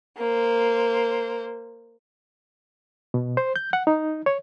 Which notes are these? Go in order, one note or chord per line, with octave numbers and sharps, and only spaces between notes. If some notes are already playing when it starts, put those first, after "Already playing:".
A#3 C5
B2
C5
G6
F#5
D#4
C#5